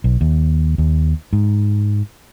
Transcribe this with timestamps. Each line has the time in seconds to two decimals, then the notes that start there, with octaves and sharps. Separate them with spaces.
0.04 B1
0.21 D#2
0.78 D#2
1.33 G#2